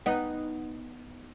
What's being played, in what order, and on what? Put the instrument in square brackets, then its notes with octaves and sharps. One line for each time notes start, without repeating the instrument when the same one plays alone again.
[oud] B3 D#4